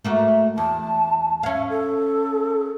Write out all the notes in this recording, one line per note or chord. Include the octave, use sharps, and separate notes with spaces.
A3 A#3 F#4
E2 A5
C#4 E5 F5
A4